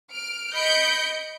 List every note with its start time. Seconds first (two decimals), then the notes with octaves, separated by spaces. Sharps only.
0.12 F6 D7
0.54 D#5 B5 G6 C#7 D7